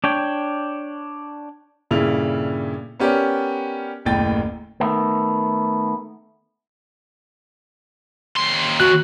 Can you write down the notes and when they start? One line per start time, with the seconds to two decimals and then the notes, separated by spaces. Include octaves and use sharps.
0.04 D4 C#5 G5
1.91 G2 A#2 C#3 E4 A4 F7
3.00 B3 C#4 G4 A#4 D5
4.05 F#1 D#2 A2 G5 A6
4.80 D#3 A3 B3
8.37 D#2 C6
8.80 F#4 F#6